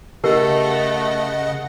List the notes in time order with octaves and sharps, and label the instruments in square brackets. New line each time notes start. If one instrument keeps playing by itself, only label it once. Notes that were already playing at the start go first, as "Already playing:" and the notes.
[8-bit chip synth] C#3 D#5 F#5 [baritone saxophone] A3 [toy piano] G4 A#4